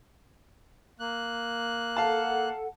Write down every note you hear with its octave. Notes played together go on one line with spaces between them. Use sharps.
A#3 F#6
A4 F5 F#5 A5